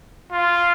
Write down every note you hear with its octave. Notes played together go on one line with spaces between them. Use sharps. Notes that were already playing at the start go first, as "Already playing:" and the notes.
F4